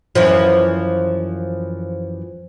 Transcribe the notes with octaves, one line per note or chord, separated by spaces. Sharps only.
F#2 E3 F3